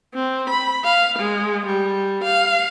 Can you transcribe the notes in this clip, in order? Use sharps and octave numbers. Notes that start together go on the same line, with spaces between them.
C4
B5
F5
G#3
G3
F5